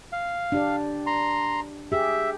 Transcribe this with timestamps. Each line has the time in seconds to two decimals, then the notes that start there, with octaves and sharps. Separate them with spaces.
0.12 F5
0.52 D4 G4 D5
1.06 A#5 C6
1.92 G4 G#4 E5